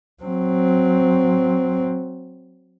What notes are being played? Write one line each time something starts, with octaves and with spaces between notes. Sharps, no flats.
F#3 C4